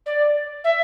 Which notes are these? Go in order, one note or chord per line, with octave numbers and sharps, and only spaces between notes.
D5
E5